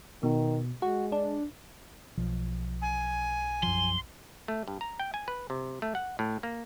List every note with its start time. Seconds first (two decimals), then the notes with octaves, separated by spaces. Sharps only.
0.23 B2 D#3
0.82 G#3 F#4
1.12 D4
2.18 B1 F3
2.81 G#5
3.63 F#2 F3 C6
4.48 A3
4.68 G2
4.81 A#5
5.00 G5
5.14 G#5
5.28 B4
5.50 C3
5.82 A3
5.95 F#5
6.19 A2
6.43 A#3